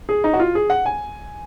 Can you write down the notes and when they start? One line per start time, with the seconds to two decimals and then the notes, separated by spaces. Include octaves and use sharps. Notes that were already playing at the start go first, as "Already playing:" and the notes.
0.09 G#4
0.24 D#4
0.34 F#4
0.40 F4
0.55 G#4
0.70 F#5
0.86 G#5